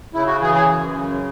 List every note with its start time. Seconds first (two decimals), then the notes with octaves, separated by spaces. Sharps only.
0.14 C#3 E4
0.27 F#4
0.41 E3 G#4
0.55 G#4
0.69 F#2
0.96 C#3